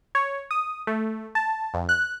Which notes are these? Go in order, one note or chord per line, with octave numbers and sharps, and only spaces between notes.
C#5
D#6
A3
A5
F2
F#6